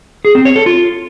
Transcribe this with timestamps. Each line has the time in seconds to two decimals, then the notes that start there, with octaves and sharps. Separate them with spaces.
0.25 G#4
0.35 C4
0.45 C#5
0.56 A4
0.66 F4